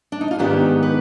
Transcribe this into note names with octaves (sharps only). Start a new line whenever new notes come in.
D4
D#4
F4
G#2 D#3 B3 D4 G4
B4